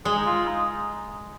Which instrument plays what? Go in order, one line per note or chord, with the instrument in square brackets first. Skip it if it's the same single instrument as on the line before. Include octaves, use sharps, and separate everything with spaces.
[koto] G#3 [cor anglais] G#4
[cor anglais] D#4
F4
D#4